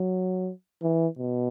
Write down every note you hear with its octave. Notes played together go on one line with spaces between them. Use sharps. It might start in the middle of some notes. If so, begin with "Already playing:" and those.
Already playing: F#3
E3
B2